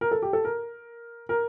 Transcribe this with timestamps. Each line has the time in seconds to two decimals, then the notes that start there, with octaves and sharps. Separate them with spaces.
0.01 A#4
0.11 A4
0.22 G4
0.33 A4
0.45 A#4
1.29 A#4